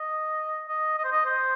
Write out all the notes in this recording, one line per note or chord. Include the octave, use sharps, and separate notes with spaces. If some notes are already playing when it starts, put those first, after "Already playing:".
Already playing: D#5
D#5
D#5
C5
D#5
C5